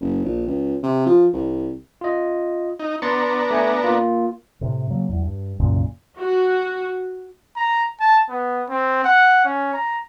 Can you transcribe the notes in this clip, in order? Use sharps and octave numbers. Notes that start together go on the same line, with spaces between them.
F#1
A#1
C#2
C3
F3
C2
F4 D#5
D#4
B3 D4 A#5 C6 A6 C#7
A3 G#5 C#7
A#3 F4
A2 C3
C#3 F#3 A#3
E2 F#3
G2
C2 F#2 A#2 C#3
F#4
A#5
A5
B3
C4
F#5
C#4
A#5